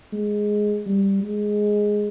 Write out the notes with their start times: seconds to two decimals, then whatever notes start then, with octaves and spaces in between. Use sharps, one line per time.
0.13 G#3
0.86 G3
1.23 G#3